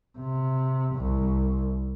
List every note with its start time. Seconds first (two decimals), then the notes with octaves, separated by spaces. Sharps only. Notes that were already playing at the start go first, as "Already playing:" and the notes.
0.18 C3
0.95 C2